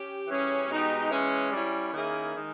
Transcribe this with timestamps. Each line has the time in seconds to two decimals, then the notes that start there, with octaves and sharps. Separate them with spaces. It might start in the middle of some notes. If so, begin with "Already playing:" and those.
Already playing: C#4 G4
0.27 E3 G3 C#4 G#4
0.68 B2 G#3 D#4 G4
1.10 E3 G#3 C#4
1.52 G3 C#4 E4
1.93 D#3 A#3 C#4 E4 G#4
2.36 D#3 G#3